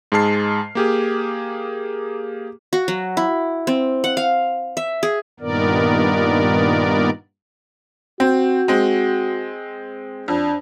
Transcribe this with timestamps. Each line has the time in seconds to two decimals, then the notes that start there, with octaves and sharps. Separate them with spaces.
0.12 G#2 G#3 G#4 A5 F6 C7
0.75 A#3 G4 G#4
2.73 F#4
2.88 F#3
3.17 E4
3.67 C4
4.04 F#5
4.17 F5
4.77 E5
5.03 G#4
5.40 G2 A#2 D#3 B3 A#4 D5
8.20 C4 F#4
8.68 G#3 C4
10.28 F2 D4